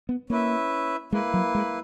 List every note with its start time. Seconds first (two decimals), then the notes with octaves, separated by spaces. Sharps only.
0.09 B3
0.30 A#3 C#4 E4 B4 E5
1.12 G#3 A#3 E4 B4
1.34 F#3
1.55 G#3